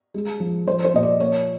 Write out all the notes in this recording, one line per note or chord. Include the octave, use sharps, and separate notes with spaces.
G#3
F3
F3 C5
C5
A#2 D#5
D5
A#3 C#5